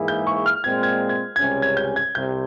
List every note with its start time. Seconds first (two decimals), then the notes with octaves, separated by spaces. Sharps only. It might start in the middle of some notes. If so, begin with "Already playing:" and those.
Already playing: G#2 E3 A#3 E4 G#4
0.08 G6
0.27 C#6
0.46 F6
0.64 A#2 G#3 C4 G#6
0.83 G#6
1.09 G#6
1.36 C#2 C3 G3 C#4 G#6
1.62 G#6
1.77 G6
1.96 G#6
2.15 C2 C3 G6